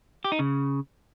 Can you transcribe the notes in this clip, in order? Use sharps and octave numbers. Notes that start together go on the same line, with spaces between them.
G4
D#4
C#3